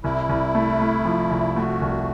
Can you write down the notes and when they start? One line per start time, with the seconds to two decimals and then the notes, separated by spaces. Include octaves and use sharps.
0.04 C2 E4
0.29 C2
0.55 A3
0.80 A3
1.05 F3
1.31 C2
1.56 A3 F#4
1.81 C2